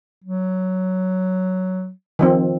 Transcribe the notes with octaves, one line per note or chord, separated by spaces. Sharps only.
F#3
D#3 F3 C4